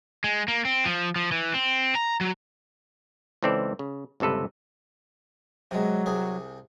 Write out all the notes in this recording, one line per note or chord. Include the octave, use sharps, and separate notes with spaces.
G#3
A#3
C4
F3
F3
E3
C4
A#5
F#3
C#2 E3 C4 A4 D5
C#3
G1 C#2 C3 A4 B4
C3 F#3 G#3
C2 C3 G#4